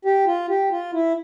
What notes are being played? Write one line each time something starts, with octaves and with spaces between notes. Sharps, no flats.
G4
F4
G4
F4
E4